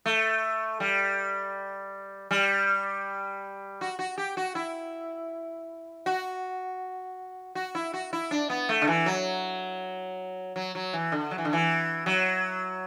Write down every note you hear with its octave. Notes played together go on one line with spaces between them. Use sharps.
A3
G3
G3
F#4
F#4
G4
F#4
E4
F#4
F#4
E4
F#4
E4
D4
B3
A3
D3
E3
F#3
F#3
F#3
E3
D3
F#3
E3
D3
E3
F#3